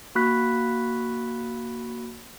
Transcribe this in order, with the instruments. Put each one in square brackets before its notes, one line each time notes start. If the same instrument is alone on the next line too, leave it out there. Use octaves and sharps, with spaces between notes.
[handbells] A#3 F#4 B5 F#6 B6